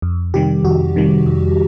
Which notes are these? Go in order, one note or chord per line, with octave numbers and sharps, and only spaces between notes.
F2
C3 D#3 G3 G4
F2 F#4
C3 D#3 G3
F2